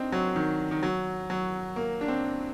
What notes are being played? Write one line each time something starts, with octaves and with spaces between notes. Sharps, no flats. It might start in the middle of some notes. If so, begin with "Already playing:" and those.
Already playing: C4 D4 D#4
F#3
D#3
D#3
F#3
F#3
A#3
D4
C4